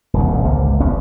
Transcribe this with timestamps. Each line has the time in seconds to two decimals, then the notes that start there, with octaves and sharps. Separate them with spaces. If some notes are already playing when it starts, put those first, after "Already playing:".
0.14 D#1 C2 G2
0.44 G#1 C#2 D3 A#3
0.80 F1 D3 B3 C#4